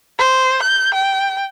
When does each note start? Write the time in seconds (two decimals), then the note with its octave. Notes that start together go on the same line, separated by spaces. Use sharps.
0.19 C5
0.62 G6
0.94 G5